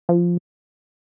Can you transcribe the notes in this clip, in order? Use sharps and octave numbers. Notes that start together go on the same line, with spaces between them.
F3